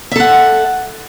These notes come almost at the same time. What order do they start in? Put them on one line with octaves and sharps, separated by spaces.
E5 A4 F#5